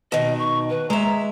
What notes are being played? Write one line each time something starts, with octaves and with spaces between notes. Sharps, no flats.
B2 D#3 D#5
C#6
B4
G#3 E5 A#5